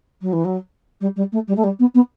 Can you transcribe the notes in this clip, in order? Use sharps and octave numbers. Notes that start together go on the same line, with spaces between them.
F#3
E3
F#3
G3
G3
A3
G3
A3
G3
B3
B3